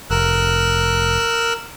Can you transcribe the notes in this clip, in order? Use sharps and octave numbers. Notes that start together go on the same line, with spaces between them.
F1 A#4 E6 F#6